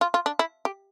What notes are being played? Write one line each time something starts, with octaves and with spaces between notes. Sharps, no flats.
F4
F4
D4
E4
G4